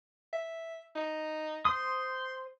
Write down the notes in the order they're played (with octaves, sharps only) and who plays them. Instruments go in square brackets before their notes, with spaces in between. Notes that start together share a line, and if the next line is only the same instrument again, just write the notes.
[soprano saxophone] E5
D#4
[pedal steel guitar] C5 D#6 [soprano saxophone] C6